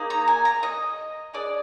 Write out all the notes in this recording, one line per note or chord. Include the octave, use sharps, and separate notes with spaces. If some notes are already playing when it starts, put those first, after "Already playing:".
Already playing: A#3 D#4 G#4
A#5
G#5
A#5
D#5
D4 G#4 D5